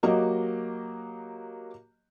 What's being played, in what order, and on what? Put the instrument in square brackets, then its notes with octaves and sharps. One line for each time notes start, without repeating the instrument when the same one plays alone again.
[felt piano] F#3 A#3 F#4 G4 D#5